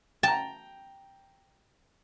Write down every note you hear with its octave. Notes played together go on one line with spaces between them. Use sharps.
G5 A5 A#5